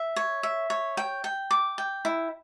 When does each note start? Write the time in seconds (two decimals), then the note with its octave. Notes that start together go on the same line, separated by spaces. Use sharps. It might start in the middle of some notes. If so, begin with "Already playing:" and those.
Already playing: E5
0.16 C#5
0.43 E5
0.70 C#5
0.97 G5
1.24 G5
1.51 D6
1.78 G5
2.05 E4